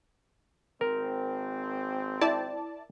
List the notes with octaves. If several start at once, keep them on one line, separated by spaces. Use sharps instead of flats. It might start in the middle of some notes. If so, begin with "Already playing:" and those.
G#1 C4 A#4
E4 D5 A5